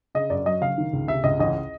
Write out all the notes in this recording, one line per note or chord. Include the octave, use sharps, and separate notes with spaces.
C#3 D#5
F#2 D5
F#3 D#5
F#1 F5
D#3
C#2
C3 E5
C#2 D#5
A1 D#5